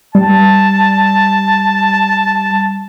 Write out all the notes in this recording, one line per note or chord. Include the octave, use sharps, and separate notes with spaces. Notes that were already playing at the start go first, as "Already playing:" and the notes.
G3 A5